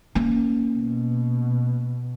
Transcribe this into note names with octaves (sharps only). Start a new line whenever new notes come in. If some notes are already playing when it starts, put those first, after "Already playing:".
A#3 C#4
B2